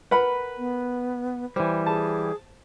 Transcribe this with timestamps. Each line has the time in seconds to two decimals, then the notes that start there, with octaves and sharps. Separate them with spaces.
0.11 A#4 B4 F#5 B5
0.58 B3
1.56 E3 G3 C5
1.86 G#4 A5